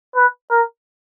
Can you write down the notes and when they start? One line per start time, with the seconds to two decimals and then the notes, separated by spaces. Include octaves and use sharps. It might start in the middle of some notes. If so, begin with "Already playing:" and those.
0.16 B4
0.50 A#4